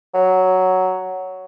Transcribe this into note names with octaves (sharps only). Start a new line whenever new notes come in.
F#3